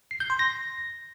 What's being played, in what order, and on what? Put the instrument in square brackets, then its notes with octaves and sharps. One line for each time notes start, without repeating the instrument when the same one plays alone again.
[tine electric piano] C7
G6
C6
A#6